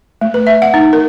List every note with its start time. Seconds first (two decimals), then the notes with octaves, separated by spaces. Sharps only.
0.21 A3
0.34 B4
0.47 E5
0.62 F#5
0.74 D#4
0.93 A#4